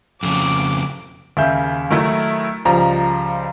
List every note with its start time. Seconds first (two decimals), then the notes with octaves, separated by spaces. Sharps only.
0.23 F2 C#3 D6
1.37 D#2 C#3 E5 G6
1.91 D#3 F#3 A3 E4
2.65 C#2 F3 G3 A#5